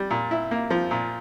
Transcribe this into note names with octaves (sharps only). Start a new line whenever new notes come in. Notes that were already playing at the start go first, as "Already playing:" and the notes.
Already playing: G3
A#2
E4
A#3
F3
A#2